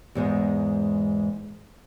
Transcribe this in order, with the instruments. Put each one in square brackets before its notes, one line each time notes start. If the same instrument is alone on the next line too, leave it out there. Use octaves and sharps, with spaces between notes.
[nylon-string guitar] E2 G#2 G#3